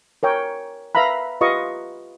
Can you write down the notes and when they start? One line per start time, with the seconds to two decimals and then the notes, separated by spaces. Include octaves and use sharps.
0.23 A#4 C#5 G5
0.95 B4 E5 F5 A#5 B5
1.41 F4 G4 B4 D#5 F5 C#6